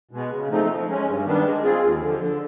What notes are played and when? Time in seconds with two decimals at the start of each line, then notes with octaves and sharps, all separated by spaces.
0.11 B2 G#3 B3
0.30 C#3
0.49 F3 A3 C4 D#4
0.68 F3
0.87 G#3 C#4
1.06 G2
1.25 D#3 G3 B3 D4
1.44 G#3
1.63 C4 F4 G#4
1.82 D#2
2.01 D3 F3
2.19 D3